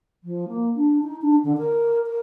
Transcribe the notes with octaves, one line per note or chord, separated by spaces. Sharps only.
F3
A#3
D4
D#4
D4
D3
A#4
A#4